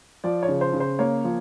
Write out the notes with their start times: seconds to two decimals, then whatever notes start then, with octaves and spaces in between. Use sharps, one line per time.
0.24 F3 D5
0.43 C#5
0.48 C#3
0.61 C5
0.73 C#3
0.80 C5
0.99 A#3 C#5
1.24 F3